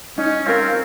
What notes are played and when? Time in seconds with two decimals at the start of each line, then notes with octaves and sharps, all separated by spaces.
0.18 C#4 D#4
0.46 C4 A#4 F5